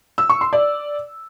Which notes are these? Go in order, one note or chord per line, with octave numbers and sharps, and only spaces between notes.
E6
C#6
C6
D5